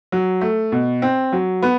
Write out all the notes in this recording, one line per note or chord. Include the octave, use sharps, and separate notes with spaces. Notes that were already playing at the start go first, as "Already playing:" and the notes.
F#3
A3
B2
C4
F#3
B3